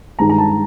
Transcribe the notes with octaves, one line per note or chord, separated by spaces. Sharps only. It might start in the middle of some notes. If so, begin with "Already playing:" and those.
G2 D#3 G#3 A#5
A#5
A5